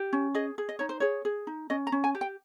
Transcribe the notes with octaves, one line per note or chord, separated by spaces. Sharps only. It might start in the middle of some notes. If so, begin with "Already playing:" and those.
Already playing: G4
C#4
G#4 D#5
G#4
D#5
D#4 C#5
C5
G#4 C#5
G#4
D#4
C#4 D#5
A#5
C#4
G#5
G4
G5